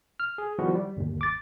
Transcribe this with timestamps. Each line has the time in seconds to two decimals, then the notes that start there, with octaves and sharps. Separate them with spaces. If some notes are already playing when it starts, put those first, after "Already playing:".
0.20 F6
0.38 G#4
0.59 D#3 F3 G3 B3 E4 F#4
0.75 G3
0.97 G1 D#2
1.21 D6 A6